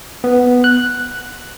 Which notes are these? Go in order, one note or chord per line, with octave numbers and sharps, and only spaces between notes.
B3
F#6